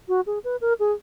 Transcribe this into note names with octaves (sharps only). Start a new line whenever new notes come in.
F#4
G#4
B4
A#4
G#4